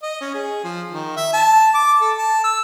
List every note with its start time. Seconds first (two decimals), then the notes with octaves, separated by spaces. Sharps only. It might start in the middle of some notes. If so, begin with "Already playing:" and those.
0.02 D#5
0.21 C#4
0.34 G#4
0.64 F3
0.91 D#3
1.16 E5
1.33 A5
1.74 D6
2.01 A4
2.18 A5
2.44 E6